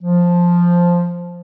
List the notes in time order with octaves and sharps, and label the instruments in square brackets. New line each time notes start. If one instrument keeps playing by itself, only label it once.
[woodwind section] F3